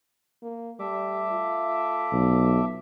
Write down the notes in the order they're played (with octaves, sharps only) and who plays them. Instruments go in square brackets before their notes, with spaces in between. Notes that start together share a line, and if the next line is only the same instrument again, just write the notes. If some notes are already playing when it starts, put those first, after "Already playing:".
[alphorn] A#3
[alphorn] G3 [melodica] A3 E5 D6
[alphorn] F4
[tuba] B1